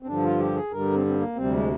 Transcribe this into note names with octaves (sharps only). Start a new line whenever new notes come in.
C4
G2 D3 F3 D4
F4
G4
G#4
G2 D3 G3 A#4
C4
C4
A#3
D2 C3 G3 C4
G#3